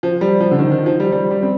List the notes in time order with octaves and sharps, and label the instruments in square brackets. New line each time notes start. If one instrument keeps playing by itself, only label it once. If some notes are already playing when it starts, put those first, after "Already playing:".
[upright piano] F3
G3
F3
D3
D#3
D#3
F3
G3
G3
G3
C4